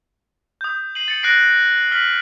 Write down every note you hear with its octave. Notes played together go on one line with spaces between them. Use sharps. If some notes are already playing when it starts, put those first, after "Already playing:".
D#6 G6
C7 D#7 F#7
A6 C#7
F#6 A#6 C7 D7
F6 B6 F#7